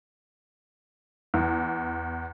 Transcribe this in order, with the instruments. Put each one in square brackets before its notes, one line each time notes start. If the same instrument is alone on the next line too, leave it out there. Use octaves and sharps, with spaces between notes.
[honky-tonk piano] E2